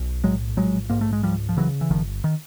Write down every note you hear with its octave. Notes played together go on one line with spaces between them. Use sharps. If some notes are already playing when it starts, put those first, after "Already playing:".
Already playing: B1
A2 F#3 G#3
A#1 F#3 G#3
G#2 A#3
A3
G#3
C#2 F3 G3
F3
C#3 E3 F#3
E3
G1 D#3 F3
D#3